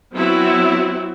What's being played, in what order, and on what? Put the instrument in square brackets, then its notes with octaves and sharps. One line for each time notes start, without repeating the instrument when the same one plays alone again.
[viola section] F#3 B3 C4 E4 F#4